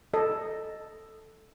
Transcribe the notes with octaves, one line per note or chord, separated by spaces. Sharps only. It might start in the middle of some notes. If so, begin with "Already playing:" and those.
A4 D#5